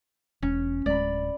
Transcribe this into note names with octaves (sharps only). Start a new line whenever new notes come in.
E1 C#4
D1 G#3 D5 B5